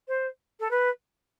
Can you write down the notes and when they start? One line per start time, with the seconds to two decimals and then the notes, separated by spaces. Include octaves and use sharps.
0.08 C5
0.60 A4
0.71 B4